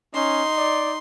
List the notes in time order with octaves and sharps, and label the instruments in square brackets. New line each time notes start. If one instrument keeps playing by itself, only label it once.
[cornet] C#4 [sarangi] D#4 [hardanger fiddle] C6
[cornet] D5